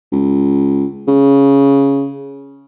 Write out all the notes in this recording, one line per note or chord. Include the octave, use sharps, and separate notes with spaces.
C#2
C#3